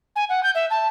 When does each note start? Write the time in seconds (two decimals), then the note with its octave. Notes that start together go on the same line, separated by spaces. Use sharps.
0.16 G#5
0.29 F#5
0.43 G6
0.55 E5
0.70 A5